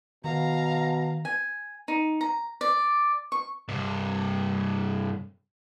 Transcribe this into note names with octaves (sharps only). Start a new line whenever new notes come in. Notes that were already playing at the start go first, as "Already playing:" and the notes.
B2 D#3 F5 A#5
G#5
D#4
A#5
D5
C#6
G2 C3